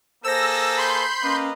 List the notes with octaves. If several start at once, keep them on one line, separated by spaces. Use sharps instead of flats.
A#3 G#4 A4 C5 E6 A#6
B5 C6 G6
A#3 C#4 B4 D#5